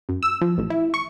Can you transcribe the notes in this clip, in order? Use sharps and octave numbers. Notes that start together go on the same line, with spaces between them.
F#2
E6
F3
A1
E4
C#6